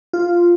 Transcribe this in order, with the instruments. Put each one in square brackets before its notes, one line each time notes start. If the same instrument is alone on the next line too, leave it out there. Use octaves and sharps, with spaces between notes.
[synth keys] F4